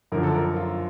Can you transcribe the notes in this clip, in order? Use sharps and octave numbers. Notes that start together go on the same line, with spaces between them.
F#2 D3 F3 A#4
A4
A#4
F4